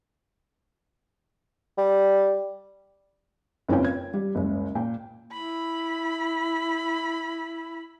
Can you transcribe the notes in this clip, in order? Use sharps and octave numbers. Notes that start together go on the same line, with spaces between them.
G3
F#1 C4 C#4 F4 B4 G5
G#6
G3
F#1 C#2
A#2 G5
E4 B5